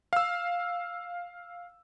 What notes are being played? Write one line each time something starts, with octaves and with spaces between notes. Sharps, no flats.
F5 E6